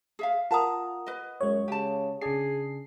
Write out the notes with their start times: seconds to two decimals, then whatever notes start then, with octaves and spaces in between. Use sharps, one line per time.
0.19 G#4 E5 F5
0.51 F4 A#4 F#5 A5 A#5 D#6
1.06 B4 D#5
1.41 F#2 G#3 C#5
1.68 C#3 G4 A5
2.21 C#3 D4 G#4 C7